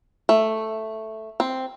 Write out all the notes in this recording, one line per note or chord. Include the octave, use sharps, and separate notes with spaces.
A3
C4